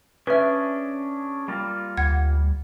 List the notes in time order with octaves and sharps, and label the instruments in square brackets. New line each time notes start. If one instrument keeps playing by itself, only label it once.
[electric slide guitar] C#4 D4 G#4 [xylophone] B4 E5
[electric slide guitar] G3 A#3 F4
[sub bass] D2 [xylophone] F#5 G#6